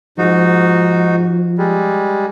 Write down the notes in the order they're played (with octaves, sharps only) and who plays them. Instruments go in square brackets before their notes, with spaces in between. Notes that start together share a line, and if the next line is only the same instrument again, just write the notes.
[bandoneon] G#2 D#4 F#4 [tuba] F3
[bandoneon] G3 G#3